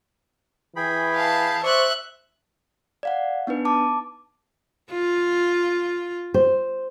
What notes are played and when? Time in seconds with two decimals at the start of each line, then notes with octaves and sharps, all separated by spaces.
0.76 E3 G#4 G5 B5
1.15 F5 A5
1.63 C5 D5 E5 C#6 F#6
3.03 D5 F5 F#5
3.47 B3 D4 D#4 B4
3.65 A5 D6
4.92 F4
6.34 C5